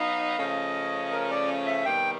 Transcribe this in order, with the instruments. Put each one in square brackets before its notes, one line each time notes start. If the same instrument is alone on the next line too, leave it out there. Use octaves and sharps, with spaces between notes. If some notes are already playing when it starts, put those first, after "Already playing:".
Already playing: [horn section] F#3 B3 D#4 [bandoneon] F5
[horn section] C#3 F3 A3 C#4 [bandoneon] D#5
[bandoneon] A#4
D5
E5
[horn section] C3 D#3 G3 B3 [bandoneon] G5